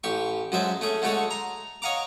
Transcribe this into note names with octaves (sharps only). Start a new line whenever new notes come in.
A1 G4 C#6
F#2 F#3 G#3 C5 E5 A5
A3 C#4 G#4
D3 G#3 A3 F#4 A4 C#5
A#5 C6
C#5 D#5 F5 F#5 A#5 D6